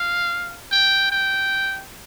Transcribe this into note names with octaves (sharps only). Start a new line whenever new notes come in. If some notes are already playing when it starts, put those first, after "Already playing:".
Already playing: F5
G5
G5